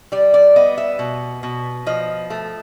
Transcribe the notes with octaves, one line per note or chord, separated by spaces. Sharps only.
G3 D5
D5
B3 D#5
E5
B2
B2
F3 D#5
A3